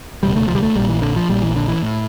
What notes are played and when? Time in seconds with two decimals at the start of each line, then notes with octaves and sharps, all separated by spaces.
0.23 E1 D2 C3 G3
0.36 A3
0.48 F3
0.55 G3
0.63 A3
0.75 A#1 A#2 G3
0.89 E3
1.02 D3
1.16 F3
1.29 A#1 A#2 G3
1.42 E3
1.56 D3
1.68 E3
1.82 A2